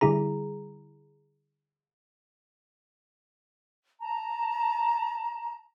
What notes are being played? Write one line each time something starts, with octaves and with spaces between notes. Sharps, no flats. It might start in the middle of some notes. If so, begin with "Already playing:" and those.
D3 G3 E4 G#4 A#5
A5 A#5